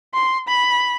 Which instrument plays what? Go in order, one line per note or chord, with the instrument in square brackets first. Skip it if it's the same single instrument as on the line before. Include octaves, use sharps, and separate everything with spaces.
[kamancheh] C6
B5